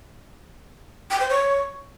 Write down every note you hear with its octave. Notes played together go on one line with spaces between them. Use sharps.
G5
C5
C#5